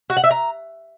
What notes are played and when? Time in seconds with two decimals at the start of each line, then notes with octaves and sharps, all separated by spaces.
0.10 F#4
0.17 F#5
0.24 E5
0.31 A#5